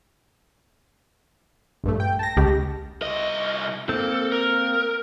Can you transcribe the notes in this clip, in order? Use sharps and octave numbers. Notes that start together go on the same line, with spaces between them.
A#1 G2 A3
G5
A5 A#6
C#2 G4
C2 D#5
A#3 C4 A4
A#4